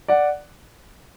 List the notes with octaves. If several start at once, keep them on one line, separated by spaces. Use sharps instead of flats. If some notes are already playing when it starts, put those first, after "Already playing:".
D5 F#5